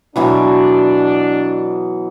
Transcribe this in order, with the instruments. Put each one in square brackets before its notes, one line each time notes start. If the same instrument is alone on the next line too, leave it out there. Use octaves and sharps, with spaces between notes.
[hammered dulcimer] B2 E3 F#3 [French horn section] D4